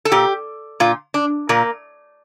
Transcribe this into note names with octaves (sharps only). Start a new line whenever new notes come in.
A4
A#2 G4
A#2 F4
D4
A#2 A#3